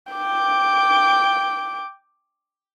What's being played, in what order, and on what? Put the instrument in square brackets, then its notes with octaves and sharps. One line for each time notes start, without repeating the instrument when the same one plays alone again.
[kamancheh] G5 D6